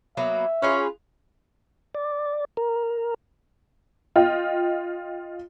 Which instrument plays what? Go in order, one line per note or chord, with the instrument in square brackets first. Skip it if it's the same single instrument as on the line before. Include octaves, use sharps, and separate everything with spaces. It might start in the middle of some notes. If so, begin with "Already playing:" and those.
[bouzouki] F#3 A#3 B3 [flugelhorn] E5
[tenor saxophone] C#4 [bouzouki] F4 G#4 B4
[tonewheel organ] D5
A#4
[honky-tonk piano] F4 D#5 G5